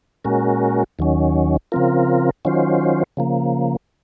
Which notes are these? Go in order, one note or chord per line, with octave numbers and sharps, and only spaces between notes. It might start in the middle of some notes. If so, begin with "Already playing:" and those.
A#2 G#3 C#4 F#4 A#4
D#2 D#3 F#3 C#4
C#3 F3 C4 F4 A#4
D#3 F#3 C#4 F4 C5
C#3 F3 A#3